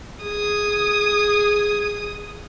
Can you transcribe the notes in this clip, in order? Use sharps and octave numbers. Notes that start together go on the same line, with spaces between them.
G#4 D#6